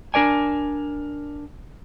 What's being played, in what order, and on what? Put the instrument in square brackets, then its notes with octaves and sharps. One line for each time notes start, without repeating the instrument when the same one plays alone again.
[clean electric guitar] D4 A#4 D5 G#5